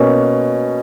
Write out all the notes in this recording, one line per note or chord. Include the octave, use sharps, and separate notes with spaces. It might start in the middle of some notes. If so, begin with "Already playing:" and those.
Already playing: B2 A#3 C#4